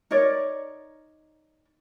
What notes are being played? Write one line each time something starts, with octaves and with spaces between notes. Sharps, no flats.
D#4 A#4 C#5 D5